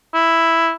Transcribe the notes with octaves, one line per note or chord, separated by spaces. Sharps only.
E4